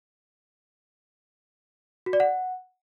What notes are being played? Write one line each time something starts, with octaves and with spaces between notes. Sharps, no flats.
F#4
D5
F#5